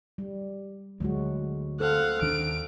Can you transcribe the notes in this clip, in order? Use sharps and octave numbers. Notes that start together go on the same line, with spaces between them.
G3
D2 F#3 G#3 F#4
A4 C5 F5 F#5
D#2 D#3 D4 D7